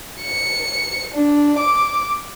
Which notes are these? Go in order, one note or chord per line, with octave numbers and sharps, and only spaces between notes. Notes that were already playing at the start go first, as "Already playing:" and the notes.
C#7
D4
D6